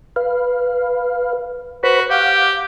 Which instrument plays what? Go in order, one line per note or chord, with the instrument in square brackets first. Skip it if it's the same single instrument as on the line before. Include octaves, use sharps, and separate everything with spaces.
[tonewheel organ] B4 F5
[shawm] F#4 [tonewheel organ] B4 C5 B5
[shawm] G4 [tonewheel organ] F5 F#5